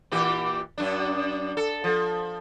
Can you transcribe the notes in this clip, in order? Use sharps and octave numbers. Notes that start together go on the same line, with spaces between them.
A#2 E3 G4
F#2 D4
A4
F3